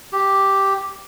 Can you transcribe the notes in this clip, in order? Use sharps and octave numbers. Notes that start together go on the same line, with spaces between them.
G4